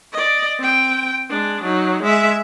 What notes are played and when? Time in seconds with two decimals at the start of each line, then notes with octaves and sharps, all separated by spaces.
0.13 D5 D#5
0.59 C4 G5
1.29 G#3 D4
1.63 F#3 D#4
2.03 G#3 E5